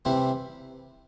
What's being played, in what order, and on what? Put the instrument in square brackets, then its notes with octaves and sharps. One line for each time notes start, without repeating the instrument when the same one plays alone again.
[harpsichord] C3 E3 G3 C4 E4